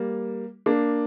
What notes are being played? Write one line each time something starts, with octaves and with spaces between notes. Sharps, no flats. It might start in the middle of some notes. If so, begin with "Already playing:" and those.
Already playing: G3 A#3
A#3 D4